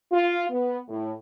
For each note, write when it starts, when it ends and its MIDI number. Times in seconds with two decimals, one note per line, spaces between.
0.12 0.44 65
0.50 0.77 59
0.88 1.12 45